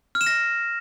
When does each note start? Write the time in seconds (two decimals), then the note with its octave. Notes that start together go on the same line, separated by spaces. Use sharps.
0.15 F6
0.21 E7
0.27 A#6